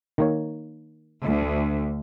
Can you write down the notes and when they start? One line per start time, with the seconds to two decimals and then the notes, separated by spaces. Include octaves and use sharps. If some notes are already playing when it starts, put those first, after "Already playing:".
0.18 D#3 A#3 C#5
1.23 D2